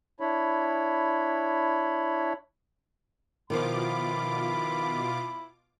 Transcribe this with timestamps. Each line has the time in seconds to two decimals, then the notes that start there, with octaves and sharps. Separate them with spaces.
0.20 D4 E4 C#5 B5
3.50 B2 D#3 F3 E4 F4 B5 D6